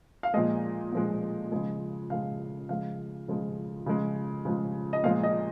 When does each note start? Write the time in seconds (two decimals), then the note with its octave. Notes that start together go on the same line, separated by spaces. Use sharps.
0.23 F5
0.34 A#2 F3 G#3 D#5
0.92 A#2 F3 G#3
1.52 C#3 F3 G#3
2.10 C#3 F3 G#3 F5
2.69 C#3 F3 G#3 F5
3.28 C#3 F3 G#3
3.86 C#3 F3 G#3
4.45 C#3 F3 G#3
4.93 D#5
5.04 A#2 F3 G#3 F5
5.23 D#5